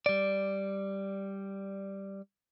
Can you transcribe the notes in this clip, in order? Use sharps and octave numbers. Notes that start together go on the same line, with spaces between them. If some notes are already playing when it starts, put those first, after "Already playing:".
G3 D5